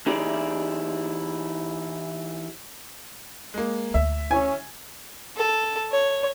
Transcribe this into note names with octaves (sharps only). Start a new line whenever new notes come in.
E3 D#4 E4 G4 G#4 D5
G#3 A#3
D2 E5
C#4 G#5
A4
C#5